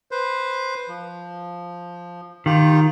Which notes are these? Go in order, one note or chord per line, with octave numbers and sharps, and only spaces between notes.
B4 C5
F3
D#3 F4 G4